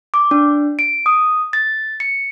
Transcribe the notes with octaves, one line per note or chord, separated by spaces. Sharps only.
D6
D4
D7
D#6
A6
C#7